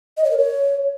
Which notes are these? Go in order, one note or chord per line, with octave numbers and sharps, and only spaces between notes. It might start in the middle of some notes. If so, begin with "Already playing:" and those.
D#5
C#5
A#4
C#5